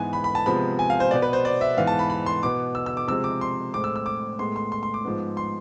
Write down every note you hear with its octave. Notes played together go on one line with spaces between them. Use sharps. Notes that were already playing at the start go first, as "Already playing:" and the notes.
Already playing: G#2 E3 B3 G#5
B5
B5
A5
C3 F3 G#3 B3 B5
G#5
F5
C5
B2 B3 D5
B4
C5
D5
E5
G#2 E3 B3 F5
A5
B5
B5
C6
B2 B3 D6
E6
E6
D6
C3 F3 G#3 C4 E6
D6
C6
A2 G#3 C4 D6
E6
E6
D6
A2 G#3 B3 C6
C6
C6
C6
D6
G#2 F3 G#3 B3
C6